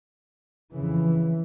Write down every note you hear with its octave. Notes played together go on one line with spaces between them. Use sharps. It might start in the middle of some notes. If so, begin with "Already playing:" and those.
F2 C#3 E3